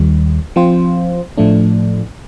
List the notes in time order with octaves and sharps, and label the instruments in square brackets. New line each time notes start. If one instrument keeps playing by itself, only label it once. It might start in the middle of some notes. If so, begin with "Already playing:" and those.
Already playing: [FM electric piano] D#2 D#3 G3
F3 C4 F4 C5
A2 F3 A3 D4